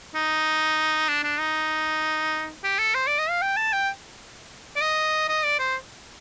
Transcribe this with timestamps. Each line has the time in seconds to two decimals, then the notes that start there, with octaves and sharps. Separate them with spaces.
0.15 D#4
1.08 D4
1.23 D4
1.39 D#4
2.64 G4
2.79 A4
2.95 C5
3.07 D5
3.19 D#5
3.30 F5
3.42 G5
3.57 A5
3.73 G5
4.76 D5
4.81 D#5
5.29 D#5
5.44 D5
5.59 C5